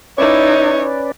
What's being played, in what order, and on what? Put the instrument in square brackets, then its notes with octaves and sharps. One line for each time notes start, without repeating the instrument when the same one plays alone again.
[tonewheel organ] C#4 B4 D5 [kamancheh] D#4 E4 [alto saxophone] C#5